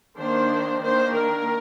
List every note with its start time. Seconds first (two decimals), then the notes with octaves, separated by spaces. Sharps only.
0.17 D#3 A#3 D4 C5
0.82 D#3 A#3 D4 C5
1.15 A#4